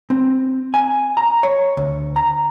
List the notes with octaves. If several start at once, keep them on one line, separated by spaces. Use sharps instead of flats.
C4
G#5
A#5
C#5
D2
A#5